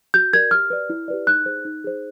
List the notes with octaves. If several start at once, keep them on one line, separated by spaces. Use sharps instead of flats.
F#4 G6
A#4 D5 G#6
G4 F6
B4 D5
E4
G4 B4 D5
D#4 F#6
G#4 C5
D#4
G#4 C5